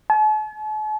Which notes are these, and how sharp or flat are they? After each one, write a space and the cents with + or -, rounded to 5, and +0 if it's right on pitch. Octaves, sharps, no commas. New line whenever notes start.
A5 -45